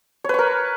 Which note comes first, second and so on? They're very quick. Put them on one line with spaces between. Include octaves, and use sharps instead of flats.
C#5 B4 C#6 A#4